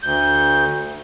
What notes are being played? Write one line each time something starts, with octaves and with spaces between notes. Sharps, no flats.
D2 G6